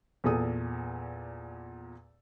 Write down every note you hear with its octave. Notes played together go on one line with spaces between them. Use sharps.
E2 A#2 A4 D#6